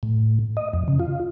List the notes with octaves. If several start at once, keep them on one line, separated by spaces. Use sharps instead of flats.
A2
D#5
F2
C#3
F4